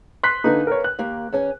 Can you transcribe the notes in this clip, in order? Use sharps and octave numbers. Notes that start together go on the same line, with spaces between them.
C6 F#6 B6
D3 A#3 D#4 B4 G#5
A#4 C#5
F#6
D#2 A#3 G4
E2 C#4 G#5